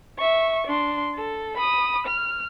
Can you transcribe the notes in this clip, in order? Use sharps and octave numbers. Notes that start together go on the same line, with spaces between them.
E5 C#6
D4 C6
A4
B5 D#6
F6